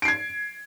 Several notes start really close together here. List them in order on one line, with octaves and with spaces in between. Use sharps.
D7 C7 G#6